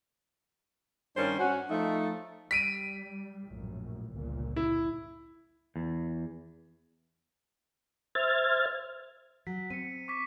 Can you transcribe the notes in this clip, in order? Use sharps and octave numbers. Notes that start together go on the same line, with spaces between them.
G2 D#3 G3 C#4 D4 C5
C#4 F#4
F3 A3 D#4
G3 B6 D7 D#7
A#1 F#2 A2
G1 C#2 A#2
E4
E2
C5 E5 F6 G#6 A6
F#3 B6
C4 C#7 D#7
C#6 D6 B6